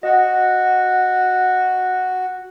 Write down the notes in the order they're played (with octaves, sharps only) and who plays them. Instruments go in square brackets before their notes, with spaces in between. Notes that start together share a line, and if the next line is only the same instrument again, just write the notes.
[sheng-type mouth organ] F#4 [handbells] D#5 F#5